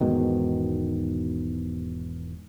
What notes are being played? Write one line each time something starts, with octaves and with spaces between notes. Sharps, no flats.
E1 G#2 B2 D#3